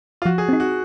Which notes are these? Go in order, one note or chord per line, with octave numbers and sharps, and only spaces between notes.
F4
F3 F#4
G#4
C4 D#4
F#4